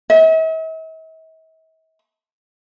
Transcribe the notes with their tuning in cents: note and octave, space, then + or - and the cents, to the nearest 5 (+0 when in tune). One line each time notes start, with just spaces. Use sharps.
E5 -45